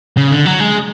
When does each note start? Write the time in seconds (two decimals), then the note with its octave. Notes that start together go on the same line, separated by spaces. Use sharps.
0.17 C#3
0.32 D3
0.46 F#3
0.60 G#3